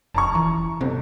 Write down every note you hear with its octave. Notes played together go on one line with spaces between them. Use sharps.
F1 A5 A#5 C#6
E3
G1 C3